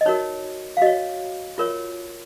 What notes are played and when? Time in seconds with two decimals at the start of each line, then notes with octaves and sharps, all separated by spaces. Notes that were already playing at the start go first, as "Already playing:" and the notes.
0.01 D#5
0.06 D#4 F#4 A#4 C#5
0.77 F5
0.82 F#4 C#5 D#5
1.58 F4 A#4 C#5